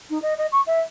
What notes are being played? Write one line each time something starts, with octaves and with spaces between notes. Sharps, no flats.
D#4
D#5
D#5
C#6
E5